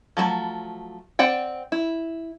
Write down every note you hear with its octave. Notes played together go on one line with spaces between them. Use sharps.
F3 F#3 G#3 A3
C4 D5 F#5 G5
E4